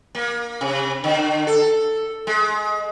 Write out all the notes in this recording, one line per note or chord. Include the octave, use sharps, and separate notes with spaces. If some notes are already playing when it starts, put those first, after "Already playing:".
A#3
C3
D3
A4
G#3